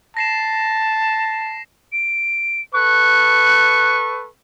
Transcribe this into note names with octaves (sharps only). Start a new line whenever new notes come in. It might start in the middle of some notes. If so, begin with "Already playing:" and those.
A5 A#6 C7 E7
D7
A4 B4 C#6 F#6